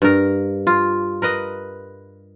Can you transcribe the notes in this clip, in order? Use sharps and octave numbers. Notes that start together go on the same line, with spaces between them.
G2 A#4
F4
A#4 B4 D#5